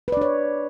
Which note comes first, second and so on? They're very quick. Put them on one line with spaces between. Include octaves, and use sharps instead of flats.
B4 D5 D4 C#5